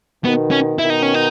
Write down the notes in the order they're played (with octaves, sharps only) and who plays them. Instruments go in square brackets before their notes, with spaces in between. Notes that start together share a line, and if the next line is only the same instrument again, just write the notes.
[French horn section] B2 D#3 [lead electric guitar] B3
[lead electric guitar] C#4
[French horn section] B2 D#3 [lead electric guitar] E4
[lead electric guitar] D#4
C#4
D#4